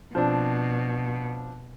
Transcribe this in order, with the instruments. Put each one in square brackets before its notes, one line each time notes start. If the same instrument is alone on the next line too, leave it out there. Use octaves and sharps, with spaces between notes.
[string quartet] B2 [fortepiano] F3 C4 D4